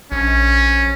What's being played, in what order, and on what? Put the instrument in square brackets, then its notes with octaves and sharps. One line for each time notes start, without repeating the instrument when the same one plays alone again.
[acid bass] A#1 [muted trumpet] C#4